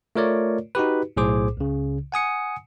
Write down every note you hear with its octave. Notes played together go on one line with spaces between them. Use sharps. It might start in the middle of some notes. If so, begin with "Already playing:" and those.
A3 F4 A#4 C#5 D5
D#4 F#4 G4 B4
B1 A2 G#4 C5 D6
C#2 C#3
F#5 G#5 D#6 C#7